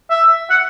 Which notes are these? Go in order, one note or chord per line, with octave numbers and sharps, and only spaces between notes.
E5
F#5